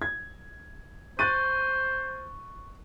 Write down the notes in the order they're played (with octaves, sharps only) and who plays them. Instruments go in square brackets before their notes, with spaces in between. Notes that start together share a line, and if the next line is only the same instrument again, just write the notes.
[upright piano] G#6
[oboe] C5 [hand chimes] C#6 [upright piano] F#6 A6 D#7